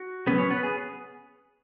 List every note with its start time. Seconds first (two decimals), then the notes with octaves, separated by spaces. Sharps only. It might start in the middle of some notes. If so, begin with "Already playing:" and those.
Already playing: F#4
0.27 C#3 F#3 B3 C#4 B4
0.38 C#4 C#5
0.50 B3 B4
0.63 G#4